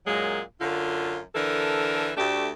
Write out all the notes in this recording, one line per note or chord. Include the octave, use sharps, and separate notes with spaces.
F#2 A#2 F#3 G#3
F#2 D3 F4
D3 E3 A4 A#4
D2 A3 D4 G4